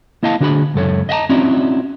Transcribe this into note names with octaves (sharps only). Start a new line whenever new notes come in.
A#3 E4 D#5 F5 A5
D3 D4 F#4 G#4 B5
C#2 F#2 A4 C#5
D#5 E5 F#5 A5 A#5
C4 C#4 D#4 E4 F#4 D5